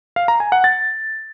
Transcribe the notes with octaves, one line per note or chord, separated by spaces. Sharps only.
F5
A#5
G#5
F#5
A6